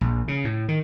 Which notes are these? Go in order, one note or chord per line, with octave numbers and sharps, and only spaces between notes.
A#1
C#3
A2
D#3